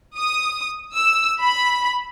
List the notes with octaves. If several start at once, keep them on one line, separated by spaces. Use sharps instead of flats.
D#6
E6
B5